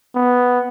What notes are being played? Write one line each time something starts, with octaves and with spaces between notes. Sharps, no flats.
B3